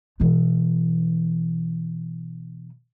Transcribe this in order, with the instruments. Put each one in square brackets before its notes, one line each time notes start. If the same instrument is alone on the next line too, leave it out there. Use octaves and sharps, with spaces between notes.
[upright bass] B2 E3